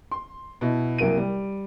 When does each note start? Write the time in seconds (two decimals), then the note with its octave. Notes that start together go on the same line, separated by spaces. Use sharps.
0.11 C6
0.61 B2 E4
0.98 C2 F#3 A#3 D7 D#7
1.17 G3